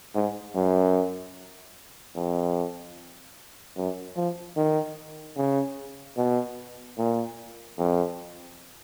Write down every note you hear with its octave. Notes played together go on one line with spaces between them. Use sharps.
G#2
F#2
F2
F#2
F3
D#3
C#3
B2
A#2
F2